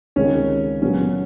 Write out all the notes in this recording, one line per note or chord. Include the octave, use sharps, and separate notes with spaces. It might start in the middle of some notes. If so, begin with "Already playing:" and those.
C#2 C3 D#3 G#3 C#4
A#2 F#3 B3 C#4